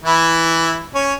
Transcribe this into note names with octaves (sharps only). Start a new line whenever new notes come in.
E3 E4
C#4 C#5